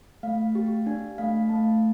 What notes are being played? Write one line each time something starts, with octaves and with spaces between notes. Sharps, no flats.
A3 F5
G4
D4
A3 F5
A3 A5